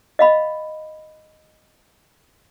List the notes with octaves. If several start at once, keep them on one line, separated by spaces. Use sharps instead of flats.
D#5 F5 B5